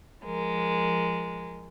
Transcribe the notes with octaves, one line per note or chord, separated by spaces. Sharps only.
F3 G#3 A#4